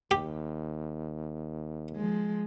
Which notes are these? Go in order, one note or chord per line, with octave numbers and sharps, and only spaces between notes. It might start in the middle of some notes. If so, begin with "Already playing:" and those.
D#2 G4
F3 G#3